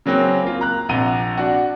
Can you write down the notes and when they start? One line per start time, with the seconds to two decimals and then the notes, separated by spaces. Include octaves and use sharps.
0.06 C#3 F#3 A#3 C4 C#4
0.43 A#3 F4
0.61 A#5 F#6
0.89 A#1 C3 F#5 A#5 D#7 G7
1.37 D4 F#4